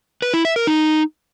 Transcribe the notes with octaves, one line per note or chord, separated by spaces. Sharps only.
B4
E4
E5
A#4
D#4